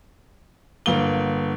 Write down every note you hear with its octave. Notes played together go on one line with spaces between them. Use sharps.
G1 A#3 G7